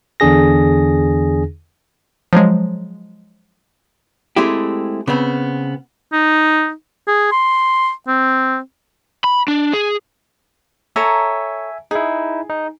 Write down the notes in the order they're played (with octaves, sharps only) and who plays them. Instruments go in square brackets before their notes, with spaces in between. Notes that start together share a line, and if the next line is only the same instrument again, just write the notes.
[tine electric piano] E2 D3 D4 G#4 A#6
[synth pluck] F3 F#3 G#3
[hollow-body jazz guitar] G#3 A3 C4 E4 G4
C#3 B3 C4
[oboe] D#4
G#4
C6
C4
[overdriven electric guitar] B5
D4
G#4
[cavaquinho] A4 C#5 A#5 [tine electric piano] E5 G#5
[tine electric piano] D#4 E4 [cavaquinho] G#4
[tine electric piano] D#4